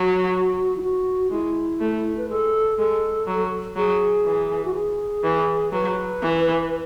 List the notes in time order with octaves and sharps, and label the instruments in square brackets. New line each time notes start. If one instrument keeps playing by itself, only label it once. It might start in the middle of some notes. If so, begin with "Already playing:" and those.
Already playing: [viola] F#3 [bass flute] F#4
[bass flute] E4
F#4
[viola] G#3 [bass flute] E4
[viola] A3
[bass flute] B4
[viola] G#3 [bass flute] A4
[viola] G#3 [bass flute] A4
[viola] F#3
[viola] F#3 [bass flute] G#4
[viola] E3
[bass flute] F#4
G#4
[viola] E3
[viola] F#3 [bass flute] B4
[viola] E3